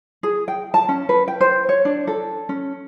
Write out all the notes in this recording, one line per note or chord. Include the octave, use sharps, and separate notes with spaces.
G#4
G5
A5
C#4
B4
G5
C5
C#5
D4
A4
C#4